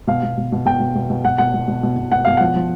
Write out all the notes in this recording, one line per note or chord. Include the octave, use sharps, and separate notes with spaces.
B2 F5
B2
B2
B2
B2 G5
B2
B2
B2
B2 F#5
B2 F#5
B2
B2
B2
B2
B2 F#5
B2 F5
F3 F#5
F3